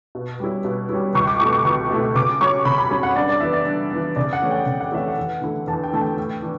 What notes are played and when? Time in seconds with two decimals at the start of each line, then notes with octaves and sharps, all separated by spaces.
0.15 B2
0.40 G3 C#4 E4
0.65 B2
0.89 G3 C#4 E4
1.14 C#2 C#6
1.27 D6
1.40 B2 A3 E4 C#6
1.53 C#6
1.65 C#2 C#6
1.91 B2 A3 E4
2.15 C#3 D6
2.41 F#3 C#4 C#6
2.65 C#3 B5
2.78 B5
2.91 F#3 C#4 C#5
3.03 F#5
3.15 G2 D5
3.29 D5
3.40 E3 B3 E5
3.53 D5
3.66 G2
3.91 E3 B3
4.16 C#3 D5
4.33 F#5
4.42 E3 A3 C#4 E4
4.51 G5
4.66 C#3 G5
4.80 F#5
4.92 E3 A3 C#4 E4 E5
5.08 F#5
5.18 E2
5.42 D3 A3 E4
5.67 E2 A5
5.83 G5
5.93 D3 A3 E4 A5
6.01 G5
6.17 A2
6.42 E3 D4